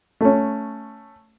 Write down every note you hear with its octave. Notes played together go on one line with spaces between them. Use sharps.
A3 C#4